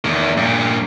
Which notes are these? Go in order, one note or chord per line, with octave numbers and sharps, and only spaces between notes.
E2 D#3
G2 A#2